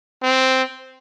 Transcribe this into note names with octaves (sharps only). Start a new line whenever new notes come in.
C4